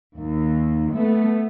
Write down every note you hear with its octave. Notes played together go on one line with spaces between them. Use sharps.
D#2
A3 B3